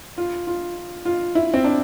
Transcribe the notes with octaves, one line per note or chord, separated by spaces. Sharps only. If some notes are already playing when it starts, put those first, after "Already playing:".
F4
F4
F4
E4
C4
D4